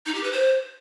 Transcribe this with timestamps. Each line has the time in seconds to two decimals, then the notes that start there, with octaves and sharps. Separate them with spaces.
0.06 D#4
0.15 G4
0.23 B4
0.32 C5